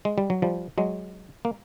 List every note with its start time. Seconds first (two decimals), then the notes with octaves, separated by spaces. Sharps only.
0.05 G#3
0.18 G3
0.30 F#3
0.42 F3 G3
0.78 F#3 G#3
1.45 A#3